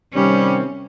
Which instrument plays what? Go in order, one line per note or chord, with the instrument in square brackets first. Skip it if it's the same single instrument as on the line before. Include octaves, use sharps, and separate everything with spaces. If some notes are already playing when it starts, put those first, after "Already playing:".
[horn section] C3 D#3 G3 C4 [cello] C#4